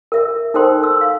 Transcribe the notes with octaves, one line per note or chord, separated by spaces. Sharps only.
A#4 E5
D#4 A4 A#4 C5 G5 C6
E6
F5